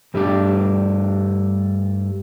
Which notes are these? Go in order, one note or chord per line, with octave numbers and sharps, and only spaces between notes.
G2 G3 A3 D4 G4